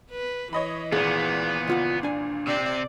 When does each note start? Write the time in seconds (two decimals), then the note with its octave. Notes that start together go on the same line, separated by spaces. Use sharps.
0.11 B4
0.53 E3 C#5 D#5 B5
0.92 G#1 A#2 B3 G#4
1.67 C#2 F4 F#5
2.03 D4 G#5
2.47 C3 C4 D5